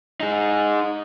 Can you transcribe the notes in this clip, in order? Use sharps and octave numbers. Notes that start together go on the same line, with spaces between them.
D#4 G#4